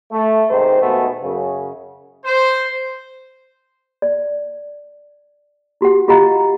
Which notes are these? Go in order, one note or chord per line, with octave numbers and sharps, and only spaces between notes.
A3
A1 G#2 C3 D#3 C5
D#2 B2 G#3 A3 B3
F#2 C#3
C5
D5
E4 F#4 G4 F#5
F4 G4 D#5 F5 F#5 A#5